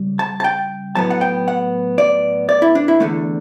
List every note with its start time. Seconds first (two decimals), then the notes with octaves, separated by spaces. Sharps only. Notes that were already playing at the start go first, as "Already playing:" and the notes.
Already playing: C#3 G3
0.19 A5
0.40 A5
0.44 G5
0.95 A2 F#3 B3 A5
1.10 F#5
1.21 G5
1.48 F#5
1.98 D5
2.49 D5
2.62 E4
2.75 D4
2.88 E4
3.00 E2 D3 A3